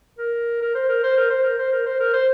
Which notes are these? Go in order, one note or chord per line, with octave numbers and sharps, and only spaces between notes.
A#4
A#4
C5
A#4
C5
A#4
C5
A#4
C5
A#4
C5
A#4
C5